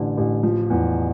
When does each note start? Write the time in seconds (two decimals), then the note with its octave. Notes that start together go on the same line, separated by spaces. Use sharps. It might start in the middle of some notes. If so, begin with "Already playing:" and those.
Already playing: A1 D3
0.17 A1
0.43 F3
0.70 E2